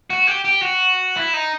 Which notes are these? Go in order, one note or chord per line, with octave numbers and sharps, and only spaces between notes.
F#4
G4
G4
F#4
E4
D#4